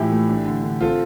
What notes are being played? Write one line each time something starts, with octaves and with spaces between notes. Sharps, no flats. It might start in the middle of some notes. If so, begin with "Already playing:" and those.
Already playing: A2 E3 F3 E4 G4
A3
D4
D3
D3
C4 F4 A4